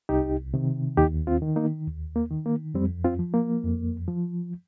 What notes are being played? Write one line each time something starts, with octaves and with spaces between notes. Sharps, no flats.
C2 D#4 G4
C3 D#3
D#2 D#4 G4
C4 F4
D#3
A#3 D#4
D#2
A#3
D#3
A#3
F2 G3 C4
C4 F4
F3
A#3
F2
F3